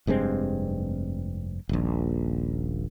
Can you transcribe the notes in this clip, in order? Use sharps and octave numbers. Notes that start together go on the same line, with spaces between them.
F1 G2 G#3 C4
D#1 A#1